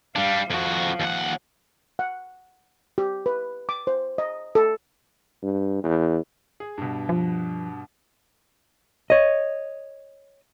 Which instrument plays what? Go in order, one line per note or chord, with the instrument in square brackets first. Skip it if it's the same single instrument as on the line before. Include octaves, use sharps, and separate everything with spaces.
[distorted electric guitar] G3 D4 [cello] F5
[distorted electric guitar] F2 F#4 [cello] F3
[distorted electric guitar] D#2 F#5
[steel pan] F#5
G4
B4
D6
C5
D#5
A4
[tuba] G2
E2
[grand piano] G#4
G2 B2
[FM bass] F3
[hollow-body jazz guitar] C#5 D#5